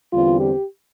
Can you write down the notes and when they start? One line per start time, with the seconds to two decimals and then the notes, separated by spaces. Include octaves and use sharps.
0.12 E2 D3 G3 C4 F4
0.40 G4